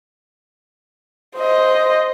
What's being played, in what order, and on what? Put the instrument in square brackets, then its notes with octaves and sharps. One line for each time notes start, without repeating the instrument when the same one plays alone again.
[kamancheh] C5 D#5